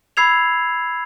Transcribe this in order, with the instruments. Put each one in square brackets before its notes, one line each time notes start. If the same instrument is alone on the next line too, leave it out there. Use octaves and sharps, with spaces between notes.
[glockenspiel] B5 E6 G#6 C7 F7